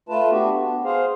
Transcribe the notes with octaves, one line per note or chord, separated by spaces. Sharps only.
A3 F4 B4 A5
B3 D4 F#4 G4
B3
G#4 C5 F5